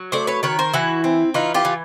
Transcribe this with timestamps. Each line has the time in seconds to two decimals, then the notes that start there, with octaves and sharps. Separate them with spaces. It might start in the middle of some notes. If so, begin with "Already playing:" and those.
Already playing: F#3
0.12 A3 C5 D5
0.27 B4 C#5
0.43 D#3 B4 C#5
0.59 A#4 C5
0.73 E3 E4 F#4
1.04 C4
1.34 E3 D#4 F4
1.54 F4 G4
1.65 E3